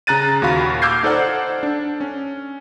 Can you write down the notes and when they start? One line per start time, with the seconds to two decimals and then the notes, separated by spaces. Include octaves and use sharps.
0.07 C#3 A#5 F#6 A6 D#7
0.42 D#2 A#2 F#4 F5 B5
0.82 D6 E6 F6 G6 G#6 C7
1.03 D#4 A4 C5 D5 F#5
1.63 D4
2.01 C#4